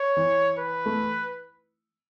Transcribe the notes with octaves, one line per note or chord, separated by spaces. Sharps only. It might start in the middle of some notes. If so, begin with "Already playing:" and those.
Already playing: C#5
E3
B4
A3